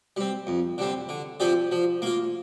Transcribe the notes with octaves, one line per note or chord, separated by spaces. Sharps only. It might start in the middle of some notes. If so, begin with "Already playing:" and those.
G3 C4
F2
D3 G3 C4
D3
F3 C4 G4 D5
F3
A#3 F4